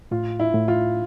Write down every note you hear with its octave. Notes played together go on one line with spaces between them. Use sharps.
A2 F4
E4
A2
F4